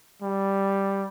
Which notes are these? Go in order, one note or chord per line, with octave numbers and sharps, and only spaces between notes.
G3